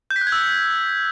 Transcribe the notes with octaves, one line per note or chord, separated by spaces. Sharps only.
G6
B6
F#6
G#6
E6